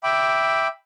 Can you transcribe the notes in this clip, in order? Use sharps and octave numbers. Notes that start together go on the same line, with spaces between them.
E5 G5 B5 D6